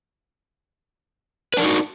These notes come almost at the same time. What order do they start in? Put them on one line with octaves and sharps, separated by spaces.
B4 D4 A#4 D#4 F#4